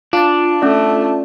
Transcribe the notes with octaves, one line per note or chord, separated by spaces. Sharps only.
D4 F4 A5
A3 C#4 D5